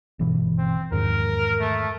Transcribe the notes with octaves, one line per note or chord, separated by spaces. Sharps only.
G1 B2 E3
C4
E2 G#2 D#3 A#4
A3